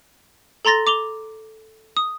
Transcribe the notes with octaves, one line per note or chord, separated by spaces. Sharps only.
A4 A#5 C6 A6 A#6
D6 F7 G7
D#6